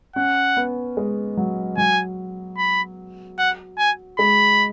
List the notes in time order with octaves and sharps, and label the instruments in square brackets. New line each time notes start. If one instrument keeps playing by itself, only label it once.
[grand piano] C#4 [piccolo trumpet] F#5
[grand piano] B3
G#3
F#3
[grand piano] F#3 [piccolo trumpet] G#5
[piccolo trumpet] B5
F#5
G#5
[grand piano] G#3 [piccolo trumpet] B5